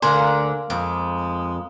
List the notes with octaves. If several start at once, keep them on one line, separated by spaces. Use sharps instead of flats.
D2 D3 A#3 A#4 C5 D5 G#5 A#5
F2 G#3 D6